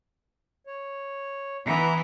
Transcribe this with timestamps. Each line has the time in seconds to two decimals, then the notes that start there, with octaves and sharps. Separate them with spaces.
0.67 C#5
1.67 E3 B3 E5 A#5